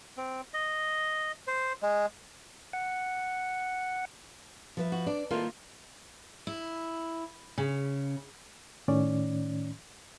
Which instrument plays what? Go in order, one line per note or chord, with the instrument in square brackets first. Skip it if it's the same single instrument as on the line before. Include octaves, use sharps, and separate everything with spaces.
[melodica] C4
D#5
C5
G#3
[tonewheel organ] F#5
[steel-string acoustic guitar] F3 B4 E5
[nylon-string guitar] F#4
[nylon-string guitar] D4 [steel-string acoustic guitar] D5
[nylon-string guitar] D#3 A#3 F4 [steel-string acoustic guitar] A3 E4 A4
[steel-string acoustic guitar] E4
C#3
[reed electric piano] A2 D#3 C#4 D5